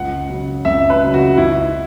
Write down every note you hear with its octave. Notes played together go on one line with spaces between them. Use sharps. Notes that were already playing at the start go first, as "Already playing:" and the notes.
Already playing: C#2 F#5
C#3 F#3
C#2 E5
B4
C#3 F#3
F#4
C#2 E4